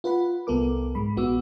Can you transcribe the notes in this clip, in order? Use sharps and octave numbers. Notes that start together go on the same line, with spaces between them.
F4 B4 F#5 B5
C2 B3 A4 A#4 D6
G#2 G#3 B5
A#1 B3 F#4 D6 E6